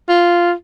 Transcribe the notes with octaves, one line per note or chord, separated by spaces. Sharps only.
F4